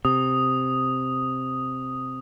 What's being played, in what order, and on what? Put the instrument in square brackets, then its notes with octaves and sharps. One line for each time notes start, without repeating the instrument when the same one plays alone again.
[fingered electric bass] C3 [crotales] D#6